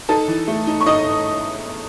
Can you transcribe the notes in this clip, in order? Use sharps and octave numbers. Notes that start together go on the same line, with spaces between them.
D#4 A4 A5
E3
A3
D#4
C#6
D#4 D#5 D#6